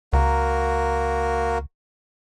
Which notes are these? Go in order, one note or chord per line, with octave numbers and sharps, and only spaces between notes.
C#2 A#3 F#4 A#4